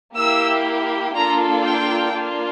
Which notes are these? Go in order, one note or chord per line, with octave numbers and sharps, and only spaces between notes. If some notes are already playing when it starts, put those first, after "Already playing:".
A#3 E4 G4 E6
A#3 D4 F4 A4 A#5
G5
A#3 D4 F4